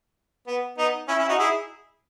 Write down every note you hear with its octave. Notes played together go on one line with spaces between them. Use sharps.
B3
B3 D#4
C#4 E4
C#4 E4
D#4 F#4
E4 G#4